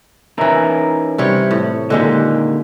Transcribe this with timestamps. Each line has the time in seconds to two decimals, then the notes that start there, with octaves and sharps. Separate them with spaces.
0.38 E3 C#4 D#4 E4 A#4
1.18 C3 G3 C#5
1.51 A2
1.90 A#2 D3 D#3 G#3 G4